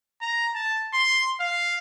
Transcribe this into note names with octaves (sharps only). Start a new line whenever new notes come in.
A#5
A5
C6
F5